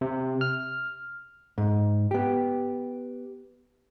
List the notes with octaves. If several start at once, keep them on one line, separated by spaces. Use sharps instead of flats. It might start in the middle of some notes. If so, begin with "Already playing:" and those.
C3
F6
G#2
B3 G4